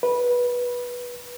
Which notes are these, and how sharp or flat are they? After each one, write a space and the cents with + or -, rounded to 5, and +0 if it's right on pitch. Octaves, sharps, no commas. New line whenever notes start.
B4 -15